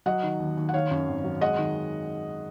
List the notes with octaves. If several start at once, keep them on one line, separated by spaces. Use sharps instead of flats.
F#3 D#5 F#5
D#3
D#2
D#2
F#5
D#3 C#5 F5
F#2
G#1
F#3
G#3 D#5 F#5
D#3